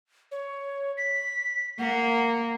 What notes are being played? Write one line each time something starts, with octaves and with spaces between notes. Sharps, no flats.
C#5
B6
A#3 F#5